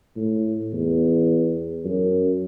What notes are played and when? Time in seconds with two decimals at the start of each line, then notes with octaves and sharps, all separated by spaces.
0.16 A2
0.73 E2
1.85 F#2